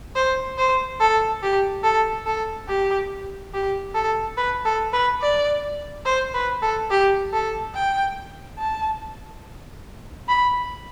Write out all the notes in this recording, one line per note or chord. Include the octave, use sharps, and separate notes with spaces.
C5
C5
A4
G4
A4
A4
G4
G4
A4
B4
A4
B4
D5
C5
B4
A4
G4
A4
G5
A5
B5